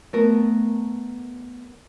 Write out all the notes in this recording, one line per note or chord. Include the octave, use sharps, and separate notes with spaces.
A3 B3 A#4